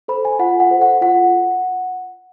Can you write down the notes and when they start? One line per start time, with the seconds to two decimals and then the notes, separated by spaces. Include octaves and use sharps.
0.08 A4 C5 B5
0.25 G#5
0.39 F4 F#5
0.60 F#5
0.71 A4 C5
0.81 F#5
1.01 F4 F#5